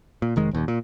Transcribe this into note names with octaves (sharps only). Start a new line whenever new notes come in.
A#2
F1 D#3 G#3
D#1 D#2
A#2